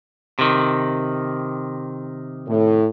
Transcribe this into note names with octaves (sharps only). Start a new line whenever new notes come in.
C3 D#3
A2